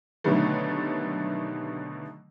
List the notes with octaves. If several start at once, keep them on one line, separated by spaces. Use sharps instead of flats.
B2 D3 D#3 F#3 G3 A3